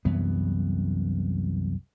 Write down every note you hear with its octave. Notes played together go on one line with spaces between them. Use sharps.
C2 F#2 E3 B3